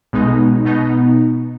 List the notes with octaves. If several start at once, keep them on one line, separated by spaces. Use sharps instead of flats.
B1 B2 G#3 B3 D#4
B2 B3 D#4